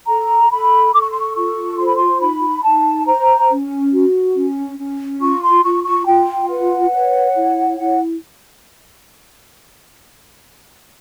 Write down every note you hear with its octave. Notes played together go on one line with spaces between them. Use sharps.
A4 A#5
A4 B5
A4 D6
C#6
C6
C#6
F4 C#6
C5 C6
B5
C6
D#4 B5
D#4 A5
C5 A#5
C#4
F#4
C#4
C#4
F4 C#6
C6
F4 C#6
C#6
F4 G5
B4 F#5
C#5
E4
E4 F#5